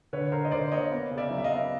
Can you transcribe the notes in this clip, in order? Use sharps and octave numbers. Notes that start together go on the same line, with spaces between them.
D3 B4 C#5
D3 A#4 C5
D#5
D3 C5 D5
A#3 C#5 D#5
B3
C#3
D5 E5
F#3
E5
D#5 F5
B3